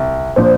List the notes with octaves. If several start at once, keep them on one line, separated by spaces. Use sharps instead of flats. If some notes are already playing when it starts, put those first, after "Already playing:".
Already playing: C2
A#2 F3 D4 C5